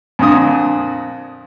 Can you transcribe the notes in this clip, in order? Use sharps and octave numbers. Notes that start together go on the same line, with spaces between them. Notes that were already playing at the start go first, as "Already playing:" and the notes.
F2 A#2 D3 D#6